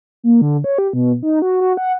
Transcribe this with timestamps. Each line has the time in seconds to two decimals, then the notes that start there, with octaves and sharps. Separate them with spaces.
0.23 A#3
0.42 D3
0.64 C#5
0.78 G4
0.93 B2
1.23 D#4
1.42 F#4
1.61 F#4
1.77 F#5